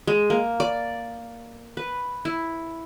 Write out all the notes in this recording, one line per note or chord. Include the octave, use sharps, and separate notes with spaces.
G#3
A#3
D5
B4
E4